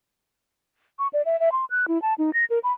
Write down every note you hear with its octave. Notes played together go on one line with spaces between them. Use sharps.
C#6
D5
E5
E5
C6
F#6
E4
A5
D#4
A#6
A#4
B5